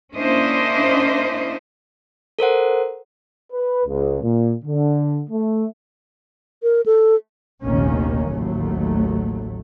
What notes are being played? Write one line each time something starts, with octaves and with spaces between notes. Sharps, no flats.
A#3 C#4 D4 E4 C5 D#5
A4 A#4 C5 F#5
B4
C#2
A#2
D3
A3
A#4
A4
F1 A#1 D#2 D#3 A#3 C#4
A1 D#2 F#3 A3